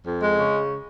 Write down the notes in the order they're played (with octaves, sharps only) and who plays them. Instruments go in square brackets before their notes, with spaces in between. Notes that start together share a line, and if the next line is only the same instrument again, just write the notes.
[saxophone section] F2
G#3
C#3